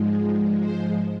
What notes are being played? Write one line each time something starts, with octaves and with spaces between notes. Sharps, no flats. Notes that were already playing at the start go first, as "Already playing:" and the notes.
Already playing: G#2 F3 G#3
C5